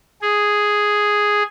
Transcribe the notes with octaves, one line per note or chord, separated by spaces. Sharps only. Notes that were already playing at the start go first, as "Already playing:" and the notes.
G#4